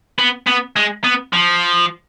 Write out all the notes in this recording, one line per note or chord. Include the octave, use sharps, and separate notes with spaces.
B3
B3
G#3
B3
F3